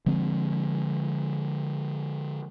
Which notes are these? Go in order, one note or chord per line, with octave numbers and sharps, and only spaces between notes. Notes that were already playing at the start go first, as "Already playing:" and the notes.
D3 F3 G#3 C4